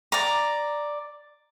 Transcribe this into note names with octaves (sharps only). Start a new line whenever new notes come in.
D5 A#5